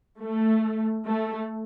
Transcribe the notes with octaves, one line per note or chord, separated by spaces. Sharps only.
A3
A3